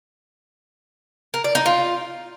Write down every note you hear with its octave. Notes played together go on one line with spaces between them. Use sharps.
A#4
D5
D#4
F4